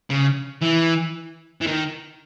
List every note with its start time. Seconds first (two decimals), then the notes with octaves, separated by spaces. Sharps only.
0.10 C#3
0.62 E3
1.61 E3
1.67 D#3